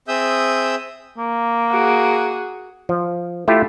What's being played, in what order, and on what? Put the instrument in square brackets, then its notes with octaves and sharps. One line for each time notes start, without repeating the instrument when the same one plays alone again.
[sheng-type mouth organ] C4 G#4 E5 D#6 E6 G6
[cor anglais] A#3
[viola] F#4 G#4
[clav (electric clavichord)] F3
A3 E4 F4 G4 E5